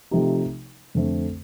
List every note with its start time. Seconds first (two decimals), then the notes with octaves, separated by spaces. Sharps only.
0.11 C3 F3 A3 D#4 G4
0.95 F2 D3 A3 C4